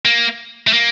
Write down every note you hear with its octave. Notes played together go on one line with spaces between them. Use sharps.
A#3
A3
A#3